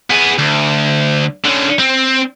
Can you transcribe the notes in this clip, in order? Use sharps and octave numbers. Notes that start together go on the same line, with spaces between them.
B3 G#4
D2
D3 C#4
C4